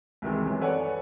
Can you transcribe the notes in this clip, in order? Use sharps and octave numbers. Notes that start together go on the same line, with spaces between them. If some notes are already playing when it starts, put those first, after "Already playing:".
C2 C3 D#3 E3 G#3
F#2 E3
A4 B4 C#5 D5 F#5 G#5